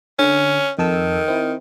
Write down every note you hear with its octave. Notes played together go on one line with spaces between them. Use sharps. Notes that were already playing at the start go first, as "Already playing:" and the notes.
D3 C#4
F2 D#3 A4 E6
C4 E4